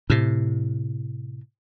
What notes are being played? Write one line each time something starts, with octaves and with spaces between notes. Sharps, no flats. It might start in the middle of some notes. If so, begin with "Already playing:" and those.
A2 C3